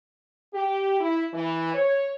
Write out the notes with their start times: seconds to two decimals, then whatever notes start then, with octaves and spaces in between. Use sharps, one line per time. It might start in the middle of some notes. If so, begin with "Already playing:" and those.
0.53 G4
1.00 E4
1.33 E3
1.74 C#5